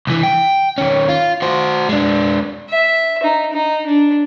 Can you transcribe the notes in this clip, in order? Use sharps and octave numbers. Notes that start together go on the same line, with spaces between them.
C2 E3
G5
D#3 C#4
F4
F#4 C5
G#3 D4
E5
D#4
D#4
D4